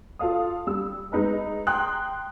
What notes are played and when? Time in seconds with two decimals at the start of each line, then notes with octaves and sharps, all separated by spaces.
0.19 F4 A4 F5 D#6
0.67 G3 E6
1.12 G#3 D#4 B4 D#5
1.67 G5 A#5 C6 D#6 F#6